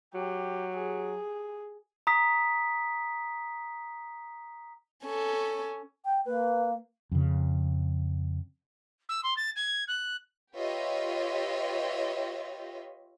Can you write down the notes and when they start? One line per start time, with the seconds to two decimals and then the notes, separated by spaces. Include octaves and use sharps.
0.14 F#3 G4
0.77 G#4
2.07 A#5 D#6 B6
5.04 C#4 A4
6.05 G5
6.26 A#3 B4
7.12 F2 C#3
9.09 E6
9.23 C6
9.37 A6
9.56 G#6
9.88 F#6
10.56 F4 G4 B4 C#5 D#5 E5